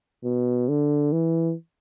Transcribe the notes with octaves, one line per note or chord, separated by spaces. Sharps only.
B2
D3
E3